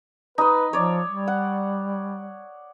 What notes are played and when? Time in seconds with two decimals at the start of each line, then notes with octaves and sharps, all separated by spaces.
0.38 D#4 B4 D#5
0.73 F3 C#5 D5
1.09 G3
1.27 F#5